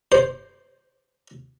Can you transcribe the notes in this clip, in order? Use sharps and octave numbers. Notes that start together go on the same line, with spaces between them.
C5